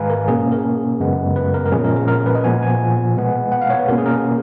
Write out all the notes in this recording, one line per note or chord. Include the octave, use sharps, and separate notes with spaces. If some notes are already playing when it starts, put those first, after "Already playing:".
Already playing: G#2 D#3 G#3 B4 F5 G#5 A#5
A#4
B2 A#3 C#4 G#4
A#4
F#2 C#3 G#3 B3
B4
A#4
A#4
A#2 F3 G#3 C#4 G#4
A#4
A#4
A#4
B4
D#5
A#2 F3 B3 G#5
G#5
B2 G#3 B3
F#5
F5
C#5
B4
B2 A#3 C#4 A#4
G#4
A#4